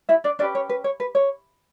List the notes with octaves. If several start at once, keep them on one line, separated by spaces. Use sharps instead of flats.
E4 E5
D4 D5
C#4 D4 G4 B4 D5
C#5
B4
C#5
B4
C#5